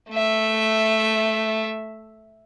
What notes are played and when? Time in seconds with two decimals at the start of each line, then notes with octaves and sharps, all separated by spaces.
0.11 A3 E5